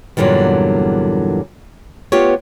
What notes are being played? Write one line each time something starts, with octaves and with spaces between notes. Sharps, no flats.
E2 G2 A#2 D3 F#3
B3 F4 G4 C#5